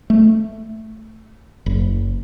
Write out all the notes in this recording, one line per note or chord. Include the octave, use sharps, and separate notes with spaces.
A3
F#1